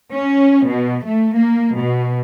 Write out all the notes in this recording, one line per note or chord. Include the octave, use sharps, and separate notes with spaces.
C#4
B2
A3
A#3
B2